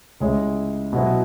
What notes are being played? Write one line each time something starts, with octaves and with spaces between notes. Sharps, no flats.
C#2 C#3 G#3 E4 C#5
B2 F#3 B3 E4